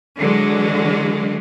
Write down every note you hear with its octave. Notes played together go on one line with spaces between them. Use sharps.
D3 E3 F#3 G#3